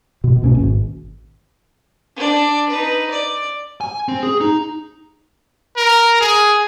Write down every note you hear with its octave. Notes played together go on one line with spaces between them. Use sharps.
B2
C#2 B2 A#3 C#4
G#1
D4 D5
D#4 B4
D5
G#5
C4
G#4
D#4
A#4
G#4